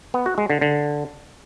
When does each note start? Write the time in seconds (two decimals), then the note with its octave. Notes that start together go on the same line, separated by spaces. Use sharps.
0.14 B3
0.26 F#4
0.38 G#3
0.50 D3
0.61 D3